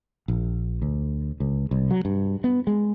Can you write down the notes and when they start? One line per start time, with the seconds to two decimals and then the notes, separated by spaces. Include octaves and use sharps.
0.28 A#1
0.82 D2
1.40 C#2
1.71 C2
1.91 F#3
2.05 G2
2.44 B3
2.67 G#3